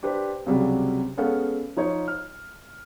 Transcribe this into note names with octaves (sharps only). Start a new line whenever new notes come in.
D4 G4 B4 C5
C#2 C3 F#3 G3
G#3 B3 C#4 A4 F5 F#5
F3 D#4 C#5
F6